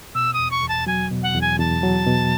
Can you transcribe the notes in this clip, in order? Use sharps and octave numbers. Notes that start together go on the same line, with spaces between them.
B2 E6
D#6
E2
C#6
E2
A5
F#3 G#5
B2
F#5
E2
G#5
E2 A5
F#3
B2